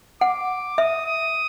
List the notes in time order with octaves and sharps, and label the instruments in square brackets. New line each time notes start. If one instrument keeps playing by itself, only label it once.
[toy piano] F#5 [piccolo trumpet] D6
[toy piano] E5 [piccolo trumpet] D#6
[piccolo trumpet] D#6